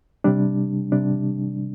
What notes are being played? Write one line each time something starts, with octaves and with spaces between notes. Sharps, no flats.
C3 G3 D4
C3 G3 D4